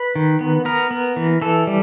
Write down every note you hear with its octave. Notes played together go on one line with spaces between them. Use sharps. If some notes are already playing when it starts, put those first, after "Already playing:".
Already playing: B4
D#3
B3
B3 A#4
B3
E3
E3 A4
G3